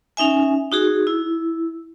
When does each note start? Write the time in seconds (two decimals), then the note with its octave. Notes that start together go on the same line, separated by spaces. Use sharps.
0.17 C#4 D#4 E5 G#5
0.71 D#4 F#4 G#4
1.07 E4